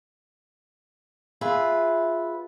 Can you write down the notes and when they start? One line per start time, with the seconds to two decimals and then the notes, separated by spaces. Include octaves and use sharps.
1.41 F4 G#4 B4 E5